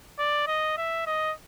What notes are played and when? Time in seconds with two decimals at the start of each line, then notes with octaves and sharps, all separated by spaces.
0.19 D5
0.47 D#5
0.77 E5
1.07 D#5